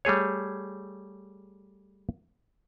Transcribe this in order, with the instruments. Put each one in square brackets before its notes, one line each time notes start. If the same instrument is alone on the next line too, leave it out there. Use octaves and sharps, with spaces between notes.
[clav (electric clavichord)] G3 A3 G#4 C#5